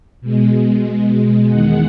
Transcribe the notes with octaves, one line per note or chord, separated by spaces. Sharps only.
B2 G#3
E2 D#3 G#3 F#5